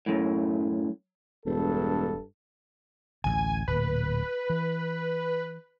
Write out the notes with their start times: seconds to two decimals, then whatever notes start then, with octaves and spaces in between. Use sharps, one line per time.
0.06 F#2 A2
1.46 E1 G2 A4
3.24 A1 D2 G#5
3.68 D1 A#2 B4
4.50 E3